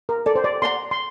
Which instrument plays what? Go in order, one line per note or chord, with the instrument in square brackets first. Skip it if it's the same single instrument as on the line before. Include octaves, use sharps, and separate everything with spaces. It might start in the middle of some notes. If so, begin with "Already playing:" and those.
[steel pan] A#4
[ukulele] A4 [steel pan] D5
[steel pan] C5
D5
[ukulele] D5 F#5 A#5 [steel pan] C6
[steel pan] C6